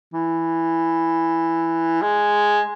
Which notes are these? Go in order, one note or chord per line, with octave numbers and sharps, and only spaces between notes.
E3
G#3